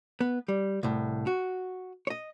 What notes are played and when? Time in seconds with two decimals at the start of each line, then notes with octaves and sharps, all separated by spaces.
0.21 B3
0.48 G3
0.83 C2 A2
1.27 F#4
2.07 C#5 D#5